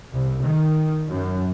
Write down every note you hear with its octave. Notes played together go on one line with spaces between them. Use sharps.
C2
D#3
F#2